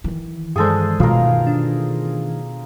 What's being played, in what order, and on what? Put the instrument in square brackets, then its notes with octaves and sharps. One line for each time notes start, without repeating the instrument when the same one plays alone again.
[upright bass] D#3 E3
[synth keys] G2 G#3 [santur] G#4 A4 C5
[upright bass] B2 [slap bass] D#3 E3 A3 [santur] F4 A#4
[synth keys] D4